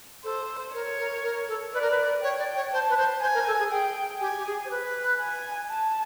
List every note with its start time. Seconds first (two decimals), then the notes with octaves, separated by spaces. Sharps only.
0.24 A4 C5
0.74 A#4 C#5
0.99 A#4
1.23 A#4
1.48 A4
1.73 B4 D5
1.82 A#4
1.91 B4
2.23 C#5 G5
2.39 D5
2.56 C#5
2.72 C5 A5
2.90 B4
2.97 C5
3.22 C5 G#5
3.34 A#4
3.47 A4
3.59 G#4
3.71 G#4 G5
4.21 G4 G#5
4.37 G4
4.46 G#4
4.65 C5
4.70 B4
5.20 G#5
5.70 A5